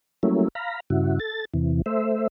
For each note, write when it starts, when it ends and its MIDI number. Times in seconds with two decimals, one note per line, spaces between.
0.23 0.48 54
0.23 0.48 55
0.23 0.48 57
0.23 0.48 58
0.23 0.48 61
0.23 0.48 64
0.55 0.80 77
0.55 0.80 82
0.55 0.80 83
0.90 1.19 43
0.90 1.19 49
0.90 1.19 64
0.90 1.19 66
1.20 1.45 69
1.20 1.45 93
1.54 1.82 40
1.54 1.82 48
1.54 1.82 52
1.86 2.27 57
1.86 2.27 72
1.86 2.27 76